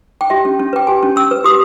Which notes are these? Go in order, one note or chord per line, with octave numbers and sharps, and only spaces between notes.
G5
G4 E5
C#4
C#4
B4 G5
G4 G#5
C#4
C#4 E6
B4
G4 D#6